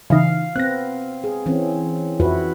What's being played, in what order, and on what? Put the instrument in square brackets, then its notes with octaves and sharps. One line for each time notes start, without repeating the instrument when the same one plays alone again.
[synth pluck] C#3 E3 D#4 [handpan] F5
[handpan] B3 C4 [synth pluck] F#6 A#6
[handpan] G#4
E3 C4 C#4
[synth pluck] F2 [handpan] E4 F#4 B4